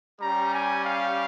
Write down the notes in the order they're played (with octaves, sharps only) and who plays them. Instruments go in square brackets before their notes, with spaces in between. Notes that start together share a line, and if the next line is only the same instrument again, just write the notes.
[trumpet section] G3 C#4 G4 A#5
G#5
F5